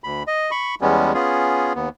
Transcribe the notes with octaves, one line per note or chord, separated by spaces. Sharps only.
D2 B5
D#5
B5 C#6
E2 G3 G#3 B3 C#4
B3 C#4 F4 G#4
D#2 B3